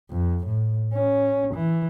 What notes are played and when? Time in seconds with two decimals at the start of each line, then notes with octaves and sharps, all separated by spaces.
0.10 F2
0.47 A2
0.93 C#4
1.54 E3